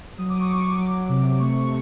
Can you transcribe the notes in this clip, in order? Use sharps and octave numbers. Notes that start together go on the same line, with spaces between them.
F#3 D#6
D6
C#6
F#3 D6
F#3
C3
A3 C#6